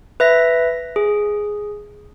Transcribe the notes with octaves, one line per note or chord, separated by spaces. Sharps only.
B4 E5 A#6
G#4